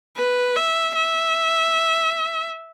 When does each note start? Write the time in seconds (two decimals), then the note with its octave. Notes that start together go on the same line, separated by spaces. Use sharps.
0.17 B4
0.56 E5
0.95 E5